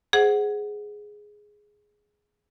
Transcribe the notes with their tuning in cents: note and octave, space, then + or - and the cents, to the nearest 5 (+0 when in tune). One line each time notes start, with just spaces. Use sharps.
G#4 +5 C5 +0 F#5 +0